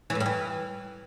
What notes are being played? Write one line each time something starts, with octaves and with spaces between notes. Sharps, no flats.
E3
A2
G2
E3